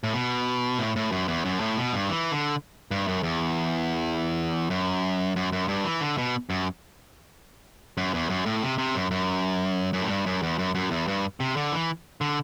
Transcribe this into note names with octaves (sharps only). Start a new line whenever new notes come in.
A2
B2
A2
A2
F#2
E2
F#2
A2
B2
G2
E3
D3
G2
F#2
E2
F#2
F#2
F#2
G2
E3
D3
B2
F#2
F#2
E2
F#2
A2
C3
C3
F#2
F#2
F#2
A2
G2
F#2
E2
F#2
F#2
E2
G2
C3
D3
E3
D3